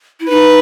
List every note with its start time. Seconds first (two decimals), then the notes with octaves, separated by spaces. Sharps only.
0.20 E4
0.29 D#4 B4